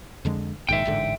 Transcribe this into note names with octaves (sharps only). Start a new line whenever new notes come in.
F2 D3 G#3
A#1 G#2 D#3 E5 G5
A1 G#2 D3